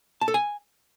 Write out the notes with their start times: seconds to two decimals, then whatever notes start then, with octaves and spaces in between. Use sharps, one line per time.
0.21 A5
0.28 A4
0.34 G#5